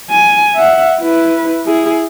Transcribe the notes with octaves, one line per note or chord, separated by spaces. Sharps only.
G#5
E5 F#5
E4 B4
E4 G#4